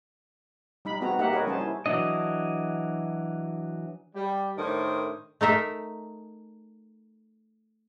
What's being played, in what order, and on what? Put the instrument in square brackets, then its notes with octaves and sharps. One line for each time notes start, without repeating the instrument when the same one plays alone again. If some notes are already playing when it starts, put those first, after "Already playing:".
[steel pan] G3 D#4 B5
B3 C4 F#4 G#4 A#5
A#3 D#4 G4 A#4 E5 F#5
G#4 A#4 B4 C#5 D#5
G3 C#4 G#4 C5 A5
E4
[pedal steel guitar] E3 F#3 D4 D#5
[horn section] G3
A2 D#3 D4 A#4 C5
[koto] A3 D#4 A#4 E5